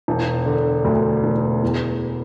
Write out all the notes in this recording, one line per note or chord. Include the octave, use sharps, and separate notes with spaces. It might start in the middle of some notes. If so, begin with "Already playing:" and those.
E1
D3
D2
E1
E2